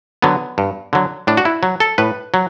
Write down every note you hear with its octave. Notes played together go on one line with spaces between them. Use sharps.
D3 F#3 B3
G2
D3 F#3
A2 D4
F#4
E4
F#3
A4
A2 B4
F#3